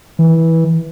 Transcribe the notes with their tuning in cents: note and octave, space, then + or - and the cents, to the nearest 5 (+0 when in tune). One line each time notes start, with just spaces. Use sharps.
E3 -15